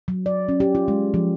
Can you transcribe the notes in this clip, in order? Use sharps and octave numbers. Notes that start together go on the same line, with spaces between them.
F#3
D5
C#4
G4
F4
G#3
F3